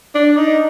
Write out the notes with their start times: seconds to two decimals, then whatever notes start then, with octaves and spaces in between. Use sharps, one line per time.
0.15 D4
0.37 D#4